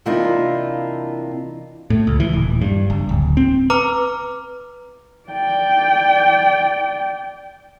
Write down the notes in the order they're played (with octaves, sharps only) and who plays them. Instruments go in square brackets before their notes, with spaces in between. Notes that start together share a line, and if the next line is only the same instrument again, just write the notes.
[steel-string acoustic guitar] C3 E3 A#3 D4 D#4 F4
[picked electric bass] A2
C#2
E3
D#1
G2
F#1
D1
C4
[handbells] B4 A#5 D6 F6
[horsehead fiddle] D5 G5